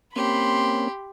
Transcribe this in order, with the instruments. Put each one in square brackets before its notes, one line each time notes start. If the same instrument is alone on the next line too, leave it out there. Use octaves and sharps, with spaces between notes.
[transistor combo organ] A#3 C4 C#4 [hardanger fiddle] G4 [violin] B5 C6